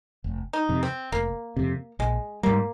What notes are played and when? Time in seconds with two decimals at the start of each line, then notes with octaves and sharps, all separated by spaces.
0.24 F1
0.53 D#4
0.69 F2 C3
0.83 C4
1.12 F1 A#3
1.56 F2 C3
1.99 A#1 G#3
2.43 G#2 G3 A#3